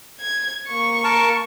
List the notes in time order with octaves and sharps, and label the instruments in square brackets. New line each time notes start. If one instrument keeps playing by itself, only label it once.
[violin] G#6
A#3 C#6
[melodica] A#4 A5